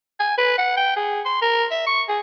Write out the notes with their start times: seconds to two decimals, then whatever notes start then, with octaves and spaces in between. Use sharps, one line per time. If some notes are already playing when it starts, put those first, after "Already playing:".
0.20 G#5
0.38 B4
0.58 F#5
0.77 G5
0.97 G#4
1.25 C6
1.42 A#4
1.71 E5
1.87 C#6
2.09 G#4